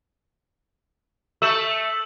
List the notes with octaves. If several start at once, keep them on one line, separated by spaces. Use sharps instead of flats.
A3 E6 E7 F#7